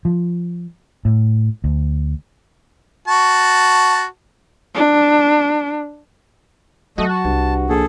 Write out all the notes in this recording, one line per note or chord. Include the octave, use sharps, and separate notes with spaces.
F3
A2
D2
F#4 A5
D4
F#3 A3 F#4 D#5
A5
C2 G2
A#1 G#4 A4